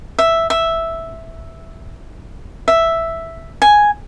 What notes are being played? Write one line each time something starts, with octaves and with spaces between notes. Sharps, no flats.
E5
E5
E5
G#5